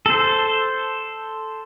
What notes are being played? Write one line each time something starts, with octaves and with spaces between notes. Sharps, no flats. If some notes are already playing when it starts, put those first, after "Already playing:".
A4 C5